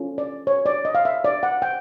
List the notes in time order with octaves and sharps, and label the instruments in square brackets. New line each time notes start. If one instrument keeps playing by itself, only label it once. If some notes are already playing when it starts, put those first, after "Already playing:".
Already playing: [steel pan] C#4 F4 A4
D5
C#5
D5
D#5
F5
E5
D5
F#5
G5